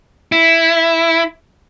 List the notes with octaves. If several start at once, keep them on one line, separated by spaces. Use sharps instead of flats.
E4